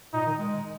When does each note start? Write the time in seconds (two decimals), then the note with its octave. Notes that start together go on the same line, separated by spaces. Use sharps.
0.14 A#2 D#4
0.26 D#3
0.39 G#3